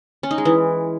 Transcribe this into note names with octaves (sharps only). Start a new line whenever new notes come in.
C#4
D#4
G#3
E3